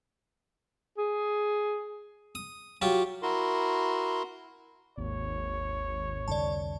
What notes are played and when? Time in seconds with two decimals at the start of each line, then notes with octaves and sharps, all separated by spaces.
0.98 G#4
2.35 D#6
2.82 F#3 F4 G4
3.22 E4 F#4 A#4 C6
4.98 G#1 D#2 C#5
6.28 C2 F2 D3 D5 A5